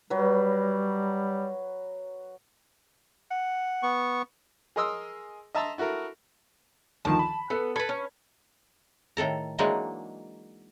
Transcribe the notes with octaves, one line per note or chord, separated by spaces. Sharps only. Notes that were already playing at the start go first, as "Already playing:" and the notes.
F#3 G3 B4
F#5
B3 C#6
G#4 A#4 D#5 C6 D#6 E6
D#5 E5 A5 A#5 C6 E6
E4 F#4 A4 A#4
D2 D#3 F3 A5
B5
B3 A4 B4
A4 B4 B5 G#6
C#4
A2 D#3 A4 A#5
E3 F#3 G#3 A#3 D4 D#4